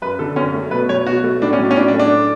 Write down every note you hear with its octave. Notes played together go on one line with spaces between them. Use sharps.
F#2 B4
D3 A4
F#2 C#4
A3
B2 B4
F#3 C#5
B2 F#4
A3
A2 D4
C#4
F#3
D4
C#4
A2 D4
D4
A3
D4